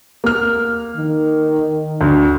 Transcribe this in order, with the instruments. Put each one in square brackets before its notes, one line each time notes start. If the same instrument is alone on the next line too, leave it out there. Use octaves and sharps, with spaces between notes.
[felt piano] A#3 F6
[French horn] D#3
[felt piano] D2